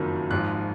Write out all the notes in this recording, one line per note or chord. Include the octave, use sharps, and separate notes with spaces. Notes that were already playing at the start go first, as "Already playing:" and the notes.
Already playing: F#1 F2 D#3 F#3
G#1 G#2 F3 F#6